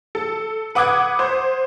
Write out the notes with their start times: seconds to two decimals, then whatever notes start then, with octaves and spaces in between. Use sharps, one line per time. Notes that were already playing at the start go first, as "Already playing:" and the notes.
0.15 A4
0.75 B4 F#5 D6 D#6 F#6 G#6
1.19 C5